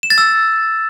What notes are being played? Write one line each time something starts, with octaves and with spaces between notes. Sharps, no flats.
E7
A6
E6